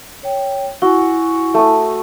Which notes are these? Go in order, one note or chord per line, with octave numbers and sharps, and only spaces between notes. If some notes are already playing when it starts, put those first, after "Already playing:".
C#5 G5
E4 F#4 G#5
A3 D#6